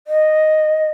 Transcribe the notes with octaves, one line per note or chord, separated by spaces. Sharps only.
D#5